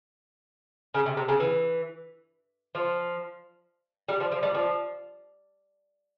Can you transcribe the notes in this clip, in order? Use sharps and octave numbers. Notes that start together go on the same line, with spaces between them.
C#3
C3
C3
C#3
E3
F3
G3
F3
F3
G3
F3